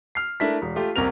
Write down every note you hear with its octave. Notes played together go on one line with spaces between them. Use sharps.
F6 C7
A3 D4 E4 A#4 B6
E1
A3 F4 G4
D#1 C2 C3 A#4 F7